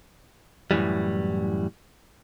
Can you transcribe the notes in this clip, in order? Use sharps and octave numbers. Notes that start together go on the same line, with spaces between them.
F#2 A2 C3 E3 G3